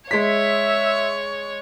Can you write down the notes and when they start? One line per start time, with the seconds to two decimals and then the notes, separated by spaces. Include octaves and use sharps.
0.11 G#3 C#5 E5 B6